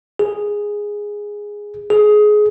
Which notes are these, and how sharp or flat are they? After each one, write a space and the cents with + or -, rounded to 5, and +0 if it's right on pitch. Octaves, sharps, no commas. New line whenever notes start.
G#4 -5
G#4 +20